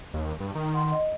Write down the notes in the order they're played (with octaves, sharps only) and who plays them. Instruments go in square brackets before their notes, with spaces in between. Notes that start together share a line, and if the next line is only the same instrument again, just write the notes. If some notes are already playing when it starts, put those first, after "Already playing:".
[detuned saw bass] D#2
G2
D#3
[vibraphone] F#5 C6
D#5